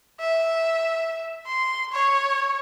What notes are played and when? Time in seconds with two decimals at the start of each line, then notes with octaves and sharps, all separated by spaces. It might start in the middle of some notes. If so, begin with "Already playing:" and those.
0.20 E5
1.46 C6
1.92 C#5